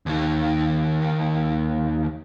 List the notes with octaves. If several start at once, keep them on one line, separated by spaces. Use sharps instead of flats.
D#2 D#3